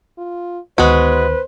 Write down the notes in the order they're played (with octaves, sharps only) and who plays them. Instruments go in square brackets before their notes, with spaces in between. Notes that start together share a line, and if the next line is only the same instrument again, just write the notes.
[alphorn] F4
[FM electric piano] D2 D#3 B3 [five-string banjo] G#3 F#4 [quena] B4 [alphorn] C5